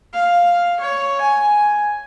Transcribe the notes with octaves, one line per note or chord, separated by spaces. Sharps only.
F5
C#5
G#5